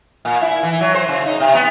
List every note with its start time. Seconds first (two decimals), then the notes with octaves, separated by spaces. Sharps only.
0.25 A#2
0.41 E4
0.63 E3
0.81 F#3
0.95 C5
1.09 C#3
1.25 D#4
1.40 C3
1.55 B3